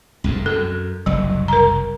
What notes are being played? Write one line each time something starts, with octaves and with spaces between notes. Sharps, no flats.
C2 F2 G#2
F#2 A4
F#1 C2 F#3
A#4 A#5